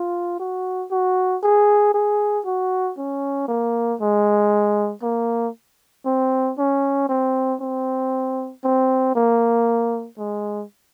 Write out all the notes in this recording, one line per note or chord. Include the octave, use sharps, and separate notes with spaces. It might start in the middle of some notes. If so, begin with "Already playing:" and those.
Already playing: F4
F#4
F#4
G#4
G#4
F#4
C#4
A#3
G#3
A#3
C4
C#4
C4
C4
C4
A#3
G#3